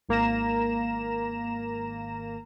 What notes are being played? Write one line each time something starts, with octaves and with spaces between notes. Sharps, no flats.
G#1 A#3 A#5 E7